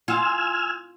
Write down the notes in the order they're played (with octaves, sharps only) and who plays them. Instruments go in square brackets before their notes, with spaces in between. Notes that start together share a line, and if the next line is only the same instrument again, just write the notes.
[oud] F4 [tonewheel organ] G#5 E6 F6